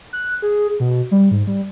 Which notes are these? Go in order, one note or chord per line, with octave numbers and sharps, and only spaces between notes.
F#6
G#4
B2
G3
G#2
G3